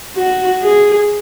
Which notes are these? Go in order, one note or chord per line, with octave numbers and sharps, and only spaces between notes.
F#4
G#4